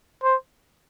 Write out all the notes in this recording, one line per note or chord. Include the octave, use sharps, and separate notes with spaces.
C5